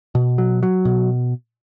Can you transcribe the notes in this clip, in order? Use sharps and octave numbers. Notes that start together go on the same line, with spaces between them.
B2
F#3
F#3
B2